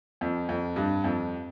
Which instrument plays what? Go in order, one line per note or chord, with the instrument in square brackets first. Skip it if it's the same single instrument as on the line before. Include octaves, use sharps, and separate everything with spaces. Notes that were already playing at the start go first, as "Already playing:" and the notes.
[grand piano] F2
F2
G2
F2